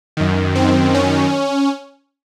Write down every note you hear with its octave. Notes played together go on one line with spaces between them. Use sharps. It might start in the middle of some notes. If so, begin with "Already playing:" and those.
F#2 D#3
C4
C#4